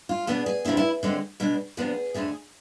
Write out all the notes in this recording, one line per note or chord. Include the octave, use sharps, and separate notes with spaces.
F4
B2 B3 D4 G#4
G#4
C3 F3 B3 D4 E4
E4
D3 G#3 C4
B2 G#3 D4
C3 F3 B3 D4 G#4
F2 D3 A3 G#4